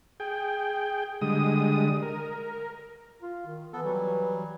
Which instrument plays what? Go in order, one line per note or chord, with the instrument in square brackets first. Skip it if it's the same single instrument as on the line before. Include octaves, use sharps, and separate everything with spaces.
[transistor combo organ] G#4 G5
D3 G3 G#3 D#6
A#4
[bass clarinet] F4
D#3
[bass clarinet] E3 [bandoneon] B3 A4
[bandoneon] F#3 G3